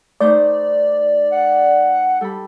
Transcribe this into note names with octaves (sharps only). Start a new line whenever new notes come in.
A3 D#4 C5 D5
F#5
G3 A4 B5